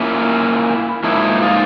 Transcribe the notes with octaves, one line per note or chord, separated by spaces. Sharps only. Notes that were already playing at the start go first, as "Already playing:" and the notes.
Already playing: A#2 A#3 C#4 E4
G#2 F3 A#3 D#4 E4
D#4 F4